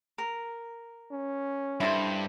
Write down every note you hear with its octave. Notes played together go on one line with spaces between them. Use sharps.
A#4
C#4
G2 E4 A4 C5